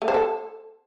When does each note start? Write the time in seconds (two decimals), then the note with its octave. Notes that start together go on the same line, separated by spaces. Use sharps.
0.02 A3
0.08 C5
0.14 A4